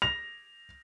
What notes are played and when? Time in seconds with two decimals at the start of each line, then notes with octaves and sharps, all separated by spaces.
0.02 A#6 F7